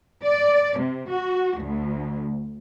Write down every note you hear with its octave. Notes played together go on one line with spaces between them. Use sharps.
D5
C3
F#4
D2